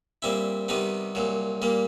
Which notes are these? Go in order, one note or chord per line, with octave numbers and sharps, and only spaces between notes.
A#2 G3 C4 E4
C3 D#3 G3 B3 D#4
C2 A#2 F#3
A#2 G3 A#3